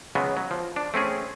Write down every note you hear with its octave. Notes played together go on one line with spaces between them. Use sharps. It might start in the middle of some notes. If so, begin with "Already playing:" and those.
C#3 F#3 G#3 B3
F#3
F3
D4
A3 C4 C#4 G#4